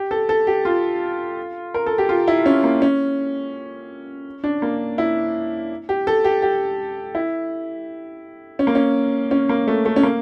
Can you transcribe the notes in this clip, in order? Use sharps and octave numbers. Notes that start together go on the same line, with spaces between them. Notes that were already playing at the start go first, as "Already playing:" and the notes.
Already playing: G4
A4
A4
G4
F4
A#4
A4
G4
F4
E4
C#4
A#3
C#4
D4
A#3
E4
G4
A4
G4
G4
E4
C#4
A#3
C#4
C#4
A#3
A3
A3
C#4
A#3